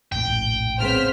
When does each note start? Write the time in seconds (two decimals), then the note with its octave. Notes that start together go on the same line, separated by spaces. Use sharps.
0.12 F1 A#1 A2 G5
0.80 C#3 B3 C4 C5 F6 B6